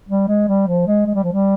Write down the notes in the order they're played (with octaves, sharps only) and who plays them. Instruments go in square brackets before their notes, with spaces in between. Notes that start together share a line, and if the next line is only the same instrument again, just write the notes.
[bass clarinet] G3
G#3
G3
F3
G#3
G#3
G3
F3
G3